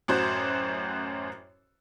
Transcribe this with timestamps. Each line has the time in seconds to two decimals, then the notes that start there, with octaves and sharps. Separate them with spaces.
0.08 A1 F#2 F#4 C5